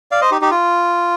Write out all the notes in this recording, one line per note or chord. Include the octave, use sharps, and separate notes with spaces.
D5 F5
C5 D#5
D#4 G4
D#4 G4
F4